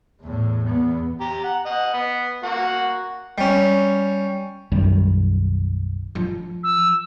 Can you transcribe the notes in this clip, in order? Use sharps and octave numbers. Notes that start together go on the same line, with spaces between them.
E2 A2
E2 B3
G4 A#5
F#5
D#5 F#5
B3
A#3 F#4 F#5
G3 C#4
B1 F#2 D#3 G3
F3
E6